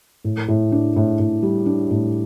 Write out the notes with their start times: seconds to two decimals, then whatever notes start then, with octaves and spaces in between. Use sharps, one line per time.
0.24 A2
0.48 A2
0.72 D4
0.96 A2
1.19 A2
1.43 G3
1.66 D4
1.91 A2